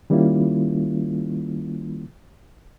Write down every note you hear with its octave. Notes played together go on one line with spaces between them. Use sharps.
D#3 G3 A#3 C#4 E4 F4